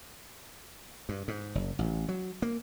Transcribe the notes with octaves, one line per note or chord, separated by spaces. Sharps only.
G2
G#2
F#1
A1
F#3
A#3